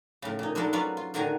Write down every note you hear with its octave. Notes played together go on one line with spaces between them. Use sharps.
A2 C#3
A#2 D#4
G#3 D4 E4 F#4 A4 A#4
F#3 C#4 F4 B4 C#5 D5
F4
A2 D3 D#3 F#4 G#5 A#5